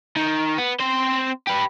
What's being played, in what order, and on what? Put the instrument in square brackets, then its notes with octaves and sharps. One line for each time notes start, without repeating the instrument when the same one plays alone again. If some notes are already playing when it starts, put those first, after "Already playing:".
[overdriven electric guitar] D#3
B3
C4 C5
G4 B4